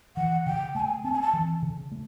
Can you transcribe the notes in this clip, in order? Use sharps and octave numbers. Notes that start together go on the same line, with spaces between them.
E3 F#5
C#3 G5
A3 G#5 A5
C4 A5
G#5
A5
E3
C#3
A3